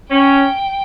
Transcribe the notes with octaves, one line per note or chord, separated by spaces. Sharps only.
C#4 G5